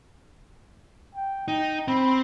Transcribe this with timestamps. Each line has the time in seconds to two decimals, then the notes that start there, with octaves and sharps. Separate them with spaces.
1.15 G5
1.48 D#4 G5
1.88 C4 B5